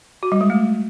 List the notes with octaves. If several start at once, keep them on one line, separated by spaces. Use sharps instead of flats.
F#4
G3
G#3
A3